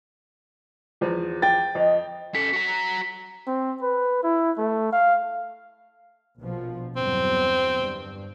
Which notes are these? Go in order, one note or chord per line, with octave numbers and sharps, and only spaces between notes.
E2 F3
G5 A6
F2 D#5
C#4 A4 B6
F#4 A#5
C4
B4
E4
A3
F5
A#1 B2 F3
G1 E2 F#3 C4
G2